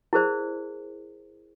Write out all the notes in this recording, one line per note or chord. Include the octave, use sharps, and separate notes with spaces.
E4 G#4 A#4 C5 D5